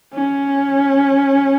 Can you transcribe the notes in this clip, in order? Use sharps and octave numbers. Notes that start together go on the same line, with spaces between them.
C#4